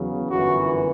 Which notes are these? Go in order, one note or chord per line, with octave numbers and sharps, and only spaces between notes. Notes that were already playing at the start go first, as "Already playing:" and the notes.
Already playing: E2 C#3 F#3
G1 F#2 E3 F#4